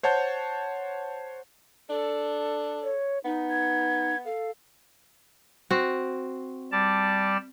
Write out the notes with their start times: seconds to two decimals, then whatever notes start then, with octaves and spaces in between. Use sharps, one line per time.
0.03 C5 C#5 F#5 A5 G6
1.90 D4 A4
2.83 C#5
3.25 B3 D#4
3.50 G#6
4.25 A4 F5
5.71 C4 F#4
6.72 G3 D5 A5